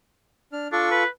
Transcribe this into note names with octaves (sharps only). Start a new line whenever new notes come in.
D4 F6
D4 F4 A4 C#6
B4